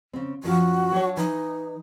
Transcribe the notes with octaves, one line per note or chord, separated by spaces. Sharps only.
C#3 C4
F#2 F3 F#4 F5
F#3 D4 C#5
E3 D#4